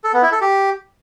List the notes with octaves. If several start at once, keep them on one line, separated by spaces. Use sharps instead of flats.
A4
B3
E4
A4
G4